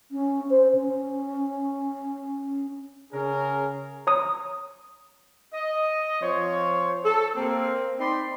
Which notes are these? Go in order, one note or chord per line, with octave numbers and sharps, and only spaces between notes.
C#4
C5
C#4
C#3 C#4 G#4 A#4
C#5 A#5 D#6
D#5
F3 C4 C5 C#5
A4
A#3 C4 A#4
C4 D#4 C5 D5 B5 C6